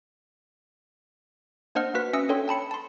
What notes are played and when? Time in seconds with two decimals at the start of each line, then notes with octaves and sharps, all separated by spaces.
1.75 A#3 D4 C5 D#5 F#5 F6
1.94 A#3 F#4 B4 B6
2.13 C#4 E5 D#6 E6 A#6 C#7
2.29 D4 A4 C#5 G5 C6
2.48 G5 A5 B5 C#7
2.71 A5 C6